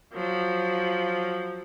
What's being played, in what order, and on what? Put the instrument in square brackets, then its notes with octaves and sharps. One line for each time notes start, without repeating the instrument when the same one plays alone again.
[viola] F3 F#3